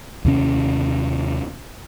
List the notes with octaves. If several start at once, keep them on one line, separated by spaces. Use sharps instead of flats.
D#2 C3 C#4